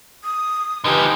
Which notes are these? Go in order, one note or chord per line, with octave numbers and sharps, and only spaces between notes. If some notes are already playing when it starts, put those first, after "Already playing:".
D#6
D3 F3 D#4 G4 B4 G#5